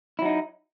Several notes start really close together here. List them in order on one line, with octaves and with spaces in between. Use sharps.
E4 F#3 D#4